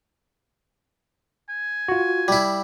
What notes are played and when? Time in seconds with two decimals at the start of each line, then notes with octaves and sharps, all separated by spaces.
1.50 G#5
1.88 F4 F#4
2.28 G3 E4